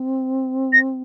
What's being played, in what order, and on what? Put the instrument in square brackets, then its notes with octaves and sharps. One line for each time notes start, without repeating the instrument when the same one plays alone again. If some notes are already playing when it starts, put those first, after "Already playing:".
Already playing: [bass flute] C4
[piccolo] A#6